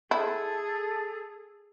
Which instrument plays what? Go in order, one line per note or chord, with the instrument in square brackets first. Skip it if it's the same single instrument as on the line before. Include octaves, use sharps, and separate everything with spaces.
[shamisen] E4 [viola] G#4 [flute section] A4